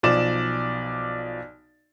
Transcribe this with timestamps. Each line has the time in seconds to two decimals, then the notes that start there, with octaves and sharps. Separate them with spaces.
0.03 B1 F3 D5 E7